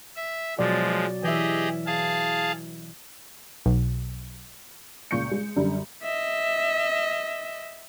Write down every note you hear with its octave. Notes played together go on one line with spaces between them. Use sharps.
E5
B2 F3 F#3 G#3 D5
E3 G4 G#4 D#5 E5
G#4 F5 A5
B1
C#2 A#2 C#6 G6 C#7
G#3
F#2 D3 G3
D#5 E5